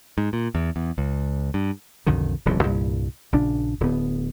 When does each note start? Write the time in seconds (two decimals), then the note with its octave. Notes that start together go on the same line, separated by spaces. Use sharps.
0.18 G#2
0.33 A#2
0.55 E2
0.76 E2
0.98 C#2
1.54 G2
2.06 B1 F2 D3 D#3
2.45 D1 C2 C#3 F3
2.63 C2 G2 A#2
3.32 A#1 C#3 D4
3.80 D1 D2 B3